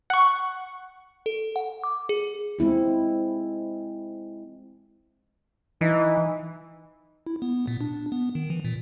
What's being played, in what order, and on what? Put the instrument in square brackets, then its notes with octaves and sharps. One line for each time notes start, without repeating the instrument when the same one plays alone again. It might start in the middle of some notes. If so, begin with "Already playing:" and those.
[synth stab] F#5 C#6
[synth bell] A4
F#5
D6
G#4
[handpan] G#3 C4 E4 G#4
[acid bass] E3 [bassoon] D#4
[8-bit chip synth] E4
B3
A#2
D4
B3
D#3
E3
A#2